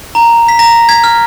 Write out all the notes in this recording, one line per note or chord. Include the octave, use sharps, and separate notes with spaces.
A#5
B6
A#5 A#6
G#6 B6
F6